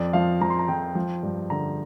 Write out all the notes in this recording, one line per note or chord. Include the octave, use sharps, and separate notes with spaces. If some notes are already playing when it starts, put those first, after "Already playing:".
Already playing: F2 D5
F3 F5
F3 A#5
C6
A#5
F2 G5
F3
G2
D3 A#5